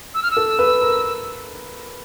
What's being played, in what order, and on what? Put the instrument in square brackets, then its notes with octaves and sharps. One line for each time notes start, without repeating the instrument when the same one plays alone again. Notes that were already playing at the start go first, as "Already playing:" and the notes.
[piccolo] E6
F6
E6
[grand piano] A4
B4
A#4